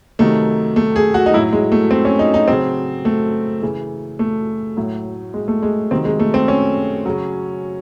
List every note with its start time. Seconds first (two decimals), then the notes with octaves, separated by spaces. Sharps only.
0.19 C3 D#3 F#3 A3
0.76 A3
0.96 G#4
1.14 F#4
1.26 D#4
1.33 F#3 E4
1.37 A2
1.53 G#3
1.72 A3
1.91 C4
2.05 C#4
2.19 D#4
2.34 D#4
2.48 C#3 F#3 C4
3.05 A3
3.62 C#3 E3
4.19 A3
4.77 A2 F#3
5.34 G#3
5.48 A3
5.62 G#3
5.91 C3 D#3 F#3 C4
6.05 G#3
6.20 A3
6.34 C4
6.48 C#4
7.06 C#3 F#3